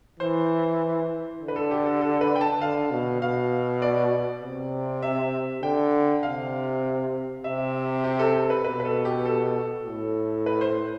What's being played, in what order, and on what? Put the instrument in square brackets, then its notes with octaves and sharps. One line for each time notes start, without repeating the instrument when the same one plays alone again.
[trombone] E3 [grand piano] C5
[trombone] D3
[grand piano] B4
A4
G4
A4
A4
B4
G5
A5
[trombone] D3 [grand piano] F5
[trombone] B2
[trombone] B2 [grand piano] F5
[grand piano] D5
[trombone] C3
[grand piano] E5
[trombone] D3 [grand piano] G5
[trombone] C3 [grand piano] F5
[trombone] C3 [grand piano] E5
[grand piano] G4
A4
A4
B4
[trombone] B2 [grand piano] B4
[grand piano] B4
A4
G4
A4
[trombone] A2
[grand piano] B4
C5